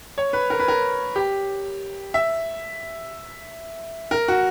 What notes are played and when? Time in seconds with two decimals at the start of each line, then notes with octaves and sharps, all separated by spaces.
0.18 C#5
0.33 B4
0.50 A#4
0.59 B4
0.68 A#4
1.16 G4
2.14 E5
4.11 A#4
4.28 F#4